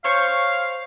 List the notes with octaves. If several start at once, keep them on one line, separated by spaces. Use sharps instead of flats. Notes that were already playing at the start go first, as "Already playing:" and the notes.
C5 C#5 F5 C#6